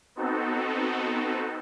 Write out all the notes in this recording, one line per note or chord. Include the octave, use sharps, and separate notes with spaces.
B3 C4 D#4 F#4 A4